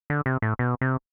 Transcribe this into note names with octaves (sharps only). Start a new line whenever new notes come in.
D3
C3
A2
B2
C3